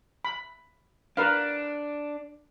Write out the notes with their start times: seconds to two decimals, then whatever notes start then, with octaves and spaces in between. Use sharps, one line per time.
0.25 B5
1.17 D4 A#4 B4 F5